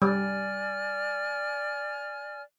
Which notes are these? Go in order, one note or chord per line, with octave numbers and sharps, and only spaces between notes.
G3 D5 G#5 F6